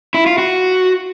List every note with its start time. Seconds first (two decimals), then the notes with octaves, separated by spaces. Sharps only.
0.14 E4
0.26 F4
0.38 F#4